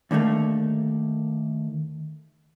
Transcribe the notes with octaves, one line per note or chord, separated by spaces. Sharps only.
D#2 D3 G3 A3 A#3